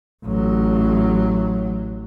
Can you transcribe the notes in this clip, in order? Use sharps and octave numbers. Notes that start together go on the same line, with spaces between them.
A1 F#3